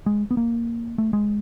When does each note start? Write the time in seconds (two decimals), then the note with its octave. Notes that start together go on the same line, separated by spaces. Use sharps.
0.06 G#3
0.31 B3
0.37 A#3
0.98 A3
1.13 G#3